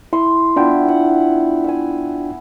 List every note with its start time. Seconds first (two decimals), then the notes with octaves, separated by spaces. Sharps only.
0.13 E4 C6
0.56 B3 D4 E4 F4 G5
0.88 F#5
1.64 E5 G#5